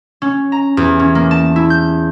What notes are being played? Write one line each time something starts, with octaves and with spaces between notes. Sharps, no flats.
C#4
A#5
E2
C#4
A#3
A5
E4
G6